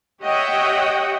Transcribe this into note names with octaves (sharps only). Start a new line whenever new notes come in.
G4 C#5 D#5 E5 F#5 G5